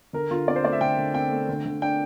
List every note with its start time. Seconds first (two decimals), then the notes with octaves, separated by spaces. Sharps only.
0.13 D3 A#4
0.31 D3 F4
0.48 C4 D5
0.56 C5
0.64 A3 D5
0.72 E5
0.81 D3 G5
0.98 D3
1.14 C4 G5
1.31 A3
1.49 D3
1.66 D3
1.82 D4 G5